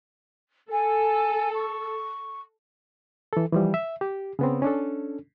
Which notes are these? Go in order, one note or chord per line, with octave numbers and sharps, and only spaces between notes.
A4 G#5
C#6
E3 A4
E3 F3 G3
E5
G4
C#3 B3 C4
C#4 D4 A4